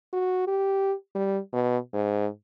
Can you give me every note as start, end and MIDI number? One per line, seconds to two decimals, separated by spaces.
0.13 0.45 66
0.47 0.94 67
1.15 1.39 55
1.53 1.78 47
1.93 2.27 44